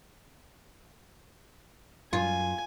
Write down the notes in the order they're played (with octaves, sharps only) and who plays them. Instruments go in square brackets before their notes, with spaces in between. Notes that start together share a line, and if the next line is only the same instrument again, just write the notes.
[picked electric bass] F#2 [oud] F4 [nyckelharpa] G#5